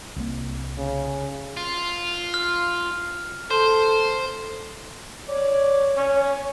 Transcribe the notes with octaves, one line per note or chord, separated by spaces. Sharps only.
C2 A#3
C#3
F4
F6
A4 C5 C6
C#5 D5
C#4